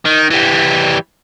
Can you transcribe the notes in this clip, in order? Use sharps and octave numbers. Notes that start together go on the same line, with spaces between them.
D#3
E3 G3